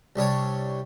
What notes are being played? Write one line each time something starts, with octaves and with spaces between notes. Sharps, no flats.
C2 G3 D4 C#5